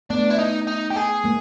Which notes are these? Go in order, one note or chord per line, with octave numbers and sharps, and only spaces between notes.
A3 B3 D4
E4
D#4
D#4
G4
G#4
G#3 A#3